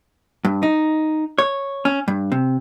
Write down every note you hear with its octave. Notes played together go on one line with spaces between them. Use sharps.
G2
D#4
C#5
C#4
G2
C3